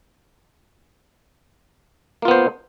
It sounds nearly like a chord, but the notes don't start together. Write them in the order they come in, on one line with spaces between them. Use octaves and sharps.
A#3 F4 B3 C5